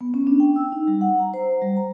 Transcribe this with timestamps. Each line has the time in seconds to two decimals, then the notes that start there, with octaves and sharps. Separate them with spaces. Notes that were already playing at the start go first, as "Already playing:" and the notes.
0.01 B3
0.14 C#4
0.27 D4
0.40 G5
0.56 E6
0.72 D#4
0.88 G3
1.01 F#5
1.19 A#5
1.34 C5
1.62 G3
1.77 A#5